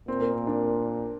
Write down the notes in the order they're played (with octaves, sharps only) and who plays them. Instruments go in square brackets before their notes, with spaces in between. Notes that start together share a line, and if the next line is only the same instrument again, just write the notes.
[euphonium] A#2 [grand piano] C4
[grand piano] A#3
C4
D4